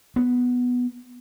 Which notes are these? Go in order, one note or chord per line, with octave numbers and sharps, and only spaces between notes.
B3